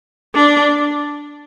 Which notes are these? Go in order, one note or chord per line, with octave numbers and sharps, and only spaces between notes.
D4